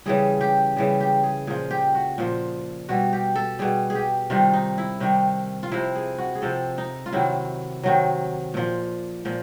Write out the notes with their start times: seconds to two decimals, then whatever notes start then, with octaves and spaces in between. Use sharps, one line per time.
0.06 C#3 E3 G3 G#4
0.41 G4
0.76 C#3 E3 G3 G#4
1.01 G4
1.23 G#4
1.47 A#2 F3 G#4
1.71 G4
1.95 F#4
2.18 A#2 F3
2.89 B2 G3 F#4
3.13 G4
3.35 A4
3.59 B2 G3 G#4
3.90 G#4
3.95 G4
4.30 C3 D#3 G3 F4
4.53 D#4
4.78 E4
5.00 C3 D#3 G3
5.63 F4
5.72 C3 F3 E4
5.95 G#4
6.18 F#4
6.35 G#4
6.42 C3 F3 A4
6.78 D#4
7.06 F4
7.13 C3 D#3 F#3 E4
7.83 C3 D#3 F#3
8.54 A#2 F3
9.25 A#2 F3